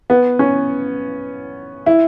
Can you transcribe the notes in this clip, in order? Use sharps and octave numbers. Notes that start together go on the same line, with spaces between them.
B3
C#4
E4